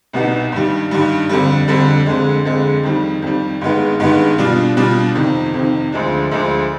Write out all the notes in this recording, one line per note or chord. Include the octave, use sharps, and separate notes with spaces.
C2 B2 B3 D#4
G2 D#3 G3
G2 D#3 G3
F2 D3 G3
F2 D3 G3
F2 D3 G#3
F2 D3 G#3
F2 D#3 G3
F2 D#3 G3
G2 D#3 G#3 B3
G2 D#3 G#3 B3
B2 G3 D4 F4
B2 G3 D4 F4
F2 C3 D#3
F2 C3 D#3
D2 D3 F3 G#3 D4
D2 D3 F3 G#3 D4